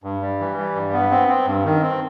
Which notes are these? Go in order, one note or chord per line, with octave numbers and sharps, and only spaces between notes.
G2
G3
E3
G3
G2
B3
C4
C4
G2
D#3
C4